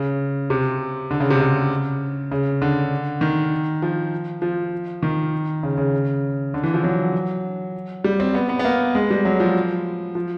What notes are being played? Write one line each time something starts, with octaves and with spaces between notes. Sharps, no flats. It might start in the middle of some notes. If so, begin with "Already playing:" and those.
Already playing: C#3
C3
D3
C#3
C3
C#3
C#3
D3
D#3
F3
F3
D#3
C#3
C#3
D3
E3
F3
F#3
G3
C4
B3
B3
B3
A#3
G#3
G3
F#3
F3
F3